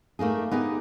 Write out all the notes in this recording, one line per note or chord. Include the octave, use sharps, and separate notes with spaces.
A3 A#3 D#4 G#4
B3 D#4 G4 G#4